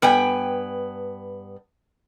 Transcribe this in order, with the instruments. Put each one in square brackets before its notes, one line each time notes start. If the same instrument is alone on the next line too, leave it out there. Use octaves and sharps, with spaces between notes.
[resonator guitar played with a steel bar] G2 B3 G5 G#5